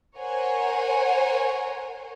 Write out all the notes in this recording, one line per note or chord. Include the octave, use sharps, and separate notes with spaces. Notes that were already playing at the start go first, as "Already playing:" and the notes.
A#4 C5 C#5 F#5 G#5